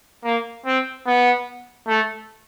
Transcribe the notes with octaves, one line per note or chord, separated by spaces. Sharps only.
A#3
C4
B3
A3